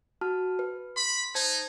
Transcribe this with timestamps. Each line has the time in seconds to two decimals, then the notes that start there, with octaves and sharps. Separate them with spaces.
0.21 F#4 A5 F6
0.59 B4
0.96 B5 C6
1.35 D#4 C5 A5 G#6